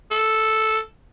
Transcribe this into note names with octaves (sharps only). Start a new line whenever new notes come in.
A4